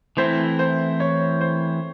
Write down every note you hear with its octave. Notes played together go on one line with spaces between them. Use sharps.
E3 A3 C4 E4 C5
C5
C#5
C5